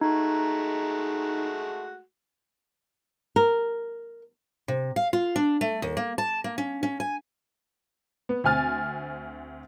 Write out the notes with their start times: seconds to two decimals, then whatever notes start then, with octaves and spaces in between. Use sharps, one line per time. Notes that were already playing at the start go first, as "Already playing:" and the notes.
0.01 G#3 A3 D#4 F#4
3.36 A#4
4.68 C3
4.96 F5
5.13 F4
5.36 D4
5.61 A3
5.82 D#2
5.97 A#3
6.18 A5
6.44 A#3
6.58 C#4
6.83 C#4
7.00 G#5
8.29 B3
8.44 D2 C4 G#5 F6 A6